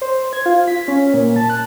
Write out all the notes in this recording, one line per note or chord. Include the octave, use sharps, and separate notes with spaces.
C5
G#6
F4
B6
C#4
A#2
A5
F#6